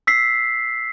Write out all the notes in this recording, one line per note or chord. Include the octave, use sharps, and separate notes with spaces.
E6 B6 C7